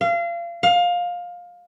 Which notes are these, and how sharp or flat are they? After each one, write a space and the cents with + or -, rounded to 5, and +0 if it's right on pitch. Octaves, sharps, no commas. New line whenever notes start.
F5 -30
F5 +20